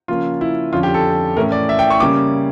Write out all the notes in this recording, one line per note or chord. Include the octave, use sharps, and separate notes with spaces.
C#3 F3 A#3 C#4 F4
E4
F2 D3 F3 C#4 F4
G4
A4
A2 E3 A3 C#4 A#4
D5
E5
G5
C#6
C#3 G3 A#3 C#4 D6